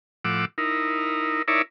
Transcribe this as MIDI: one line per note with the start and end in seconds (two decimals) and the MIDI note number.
0.25 0.45 45
0.25 0.45 53
0.25 0.45 78
0.25 0.45 86
0.25 0.45 88
0.58 1.42 63
0.58 1.42 64
0.58 1.42 70
1.48 1.62 63
1.48 1.62 64
1.48 1.62 70
1.48 1.62 73
1.48 1.62 74
1.48 1.62 76